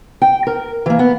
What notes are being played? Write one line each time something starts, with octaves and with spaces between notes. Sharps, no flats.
G5
A#4
E3 A#3
B3